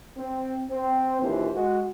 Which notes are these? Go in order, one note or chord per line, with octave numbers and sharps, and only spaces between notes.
C4
C4
A#1 D#2 E3 C5
G#3 F#4